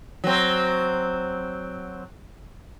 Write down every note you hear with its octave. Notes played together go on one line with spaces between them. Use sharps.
F#3 C4